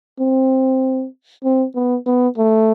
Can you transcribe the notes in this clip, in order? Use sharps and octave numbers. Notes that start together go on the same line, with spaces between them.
C4
C4
B3
B3
A3